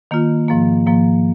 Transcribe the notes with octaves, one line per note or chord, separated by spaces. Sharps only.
D#3 A#3 F4
G#2 F3 A#3
G#2 F3 A#3